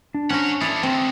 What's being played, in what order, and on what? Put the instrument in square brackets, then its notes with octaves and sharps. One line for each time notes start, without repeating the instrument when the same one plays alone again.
[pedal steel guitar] D4
[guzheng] C#4 C5 A#5 [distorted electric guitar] C#5 F#5
[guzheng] E4 D5 A5 [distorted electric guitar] A4 F5 [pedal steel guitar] D#6
[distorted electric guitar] D3 G#3 [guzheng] C4